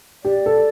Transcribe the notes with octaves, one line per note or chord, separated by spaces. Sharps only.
G4 D5
A4